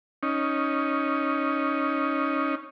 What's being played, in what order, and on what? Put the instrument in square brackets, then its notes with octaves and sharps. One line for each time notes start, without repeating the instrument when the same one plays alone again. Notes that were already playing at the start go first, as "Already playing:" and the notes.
[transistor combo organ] C#4 D#4